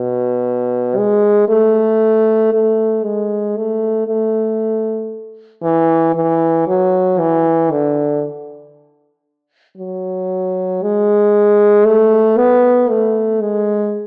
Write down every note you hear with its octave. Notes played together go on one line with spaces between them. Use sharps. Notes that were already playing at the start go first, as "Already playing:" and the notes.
Already playing: B2
G#3
A3
A3
G#3
A3
A3
E3
E3
F#3
E3
D3
F#3
G#3
A3
B3
A3
G#3